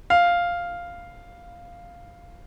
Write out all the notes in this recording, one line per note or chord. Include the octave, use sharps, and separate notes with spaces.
F5